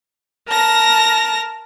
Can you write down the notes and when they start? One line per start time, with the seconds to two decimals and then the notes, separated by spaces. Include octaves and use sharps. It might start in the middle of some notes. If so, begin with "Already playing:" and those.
0.48 A#4 A5 A#6